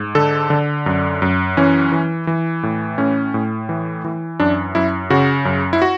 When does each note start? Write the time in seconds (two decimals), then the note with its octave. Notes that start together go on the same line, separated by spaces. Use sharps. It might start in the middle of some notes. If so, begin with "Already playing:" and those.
Already playing: G#2
0.15 D3 A4
0.50 D3
0.86 F#2
1.22 F#2
1.57 E3 C#4
1.92 E3
2.27 E3
2.63 A2
2.98 A2 C#4
3.34 A2
3.69 E3
4.04 E3
4.40 F#2 D4
4.75 F#2 E4
5.10 C#3 F#4
5.45 F#2
5.73 E4
5.82 F#4